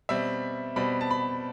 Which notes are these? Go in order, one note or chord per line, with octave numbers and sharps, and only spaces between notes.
B2 G3 C4 E5
B2 G3 C4 B5
A5
B5